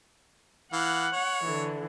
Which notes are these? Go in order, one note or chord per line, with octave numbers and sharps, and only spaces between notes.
E3 F5 F#5
C#5
D3 E3